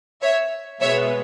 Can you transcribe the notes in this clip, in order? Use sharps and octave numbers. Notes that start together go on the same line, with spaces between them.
C#5 E5
B2 G#3 B3 C#5 E5